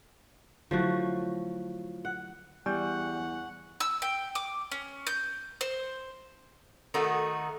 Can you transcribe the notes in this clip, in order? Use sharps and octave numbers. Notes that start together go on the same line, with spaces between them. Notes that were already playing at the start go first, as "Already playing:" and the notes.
D3 F3 F#3 A3 E4 F#4
F#5
E2 G3 F#5 G#5 C#6 G6
E6
G5
D6
C#4
G6
C5
D#3 A3 D#4 F#4